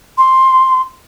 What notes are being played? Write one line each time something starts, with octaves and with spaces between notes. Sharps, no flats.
C6